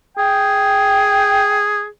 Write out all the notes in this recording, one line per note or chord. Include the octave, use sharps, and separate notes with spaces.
G#4 G5